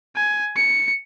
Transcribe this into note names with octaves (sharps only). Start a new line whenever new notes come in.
G#5
C#7